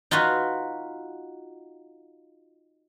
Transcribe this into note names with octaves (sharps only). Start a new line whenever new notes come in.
D#4 F4 F#4 B4 F5